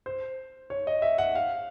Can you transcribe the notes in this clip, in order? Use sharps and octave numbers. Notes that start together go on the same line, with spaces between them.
C5
C#5
D#5
E5
F#5
F5